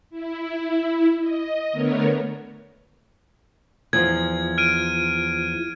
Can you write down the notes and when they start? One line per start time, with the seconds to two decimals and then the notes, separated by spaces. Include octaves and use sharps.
0.10 E4
1.19 D#5
1.72 D3 A3 B3 A#4 C#5
3.93 E2 F3 G#6
4.58 F6 D7 D#7